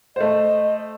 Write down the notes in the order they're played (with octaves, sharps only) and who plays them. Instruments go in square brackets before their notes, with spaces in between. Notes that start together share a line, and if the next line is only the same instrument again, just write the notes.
[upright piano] A3 C5 [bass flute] D#5